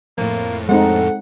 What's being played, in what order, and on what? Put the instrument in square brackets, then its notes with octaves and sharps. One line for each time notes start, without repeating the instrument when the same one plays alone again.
[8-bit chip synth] F2 A2 [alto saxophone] A#3
[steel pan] G#3 C4 D#4 [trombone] A4 [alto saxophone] F#5